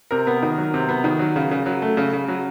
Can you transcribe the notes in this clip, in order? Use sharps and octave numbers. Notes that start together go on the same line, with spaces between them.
C3 A#4
B3
D#3
F#3
C3
B3
D#3
F#3
C#3
C#3
F#3
A3
C#3
C#3
F#3